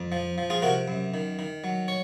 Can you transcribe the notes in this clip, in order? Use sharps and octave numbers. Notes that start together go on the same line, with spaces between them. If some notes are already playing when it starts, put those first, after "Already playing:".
Already playing: F2
F3
F3
F4 G#4
C3 F#4 A#4
F#2
D#3
D#3
F#3
C#5